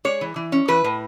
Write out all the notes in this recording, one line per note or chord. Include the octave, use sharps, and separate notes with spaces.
G#3 C#5
E3
E3
C#4
E3 B4
A2